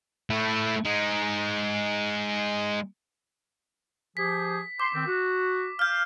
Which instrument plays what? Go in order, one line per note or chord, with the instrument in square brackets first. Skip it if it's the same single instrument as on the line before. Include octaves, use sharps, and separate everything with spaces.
[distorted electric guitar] A3 E4
G#3 D#4
[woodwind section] F3 G4 G#4 [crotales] B6
[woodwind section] C6 [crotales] D6
[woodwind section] D#3 C4
F#4
[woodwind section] F5 [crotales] F6 G6